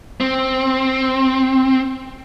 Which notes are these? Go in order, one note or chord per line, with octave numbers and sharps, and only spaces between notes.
C4